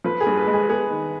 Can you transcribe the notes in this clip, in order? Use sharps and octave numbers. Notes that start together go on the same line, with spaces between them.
F3 B4
G#4
G2
B4
G#3
G#4
B3 G#4
D#3